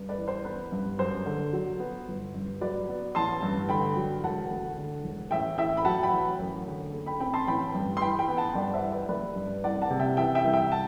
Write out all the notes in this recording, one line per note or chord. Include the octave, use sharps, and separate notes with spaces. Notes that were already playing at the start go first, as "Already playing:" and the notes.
Already playing: G2
B4 D5
E3
C5
B3 B4
G2
F#2 C5
D3
F#3
B3
G1
G2
F#3 B4 D5
B3
A1 A5 C6
G2
D3 G5 B5
F#3
E1 F#5 A5
D2
D3
E1
A1 E5 G5
A2 E5 G5
B5
F#3 F#5 A5
G5 B5
A1
F#2
D3
A3
G5 B5
C4 G5 B5
A5 C6
A1 G5 B5
G2
C6
E3 G5 B5
G5 B5
B3
F#5 A5
G2 D5 F#5
C5 E5
E3
B4 D5
G3 B4 D5
G2
C2 D5 F#5
F#5 A5
C3
E5 G5
E3 E5 G5
E5 G5
C2
E5 G5
F#5 A5